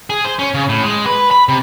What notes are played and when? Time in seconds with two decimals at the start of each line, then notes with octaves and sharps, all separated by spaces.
0.10 G#4
0.25 C5
0.39 C#4
0.54 C#3
0.69 A2
0.84 G#3
1.06 B4
1.31 B5
1.49 C3